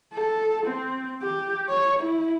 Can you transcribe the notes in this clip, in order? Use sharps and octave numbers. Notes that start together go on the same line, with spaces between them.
A4
C4
G4
C#5
E4